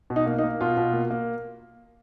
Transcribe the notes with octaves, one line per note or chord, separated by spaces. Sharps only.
B2
D#4
A#3
D#4
A#3
B2 F4
B2
A#3
A#3